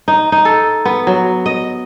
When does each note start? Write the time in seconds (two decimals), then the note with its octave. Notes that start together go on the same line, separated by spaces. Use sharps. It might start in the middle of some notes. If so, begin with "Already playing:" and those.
0.08 D#4
0.32 D#4
0.45 A4
0.85 B3
1.07 F#3
1.46 D#5